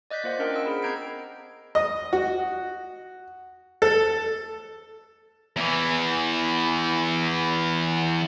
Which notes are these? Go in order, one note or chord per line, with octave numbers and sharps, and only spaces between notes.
D5 D#5 F#6 G6 B6
A#3 F4 C5 D5 F#5
C#4 D4 A#4 D#5 G5
F#5 G5 E6
G#4 A#4 B5
C4 A#5 G6 G#6 C7 D7
D#5
F#4
A4
E2 E3